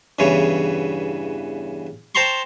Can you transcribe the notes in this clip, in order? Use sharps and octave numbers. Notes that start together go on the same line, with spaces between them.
E2 G2 C#3 E3 C#5
C5 G5 A5 A#5 C6 C#6